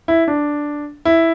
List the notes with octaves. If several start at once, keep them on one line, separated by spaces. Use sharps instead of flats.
E4
D4
E4